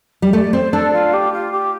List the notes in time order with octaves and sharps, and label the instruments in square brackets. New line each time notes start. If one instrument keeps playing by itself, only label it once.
[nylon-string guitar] G3
[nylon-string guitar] A3 [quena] D5
[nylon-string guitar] C4 [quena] C5
[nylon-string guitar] D4 [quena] A4
[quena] F4
G4
F4
G4